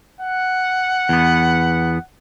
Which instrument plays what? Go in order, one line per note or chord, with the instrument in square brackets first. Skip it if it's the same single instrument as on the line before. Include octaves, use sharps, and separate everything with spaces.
[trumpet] F#5
[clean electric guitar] E2 B3